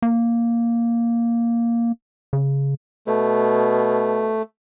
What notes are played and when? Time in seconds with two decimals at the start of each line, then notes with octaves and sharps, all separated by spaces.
0.02 A#3
2.33 C#3
3.07 B2 A3